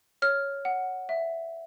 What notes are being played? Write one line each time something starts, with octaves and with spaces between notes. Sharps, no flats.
C#5 F6
F#5
E5